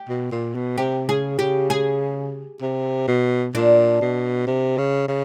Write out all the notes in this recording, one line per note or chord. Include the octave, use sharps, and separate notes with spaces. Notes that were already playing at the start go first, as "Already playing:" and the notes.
Already playing: G4
B2
A#2
B2
C3 G4
C#3 G#4
C#3 G4
G#4
C3
B2
A#2 D4
B2
C3
C#3
C#3